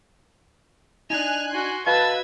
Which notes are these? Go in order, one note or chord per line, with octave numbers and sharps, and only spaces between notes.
D4 D#4 G#5 F#6 F7
F#4 C6
F#4 B4 D#5 F5 A5 E6 G#6